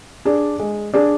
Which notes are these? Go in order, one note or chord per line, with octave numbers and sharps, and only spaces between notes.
D4 G#4 D5
G#3
D4 G#4 D5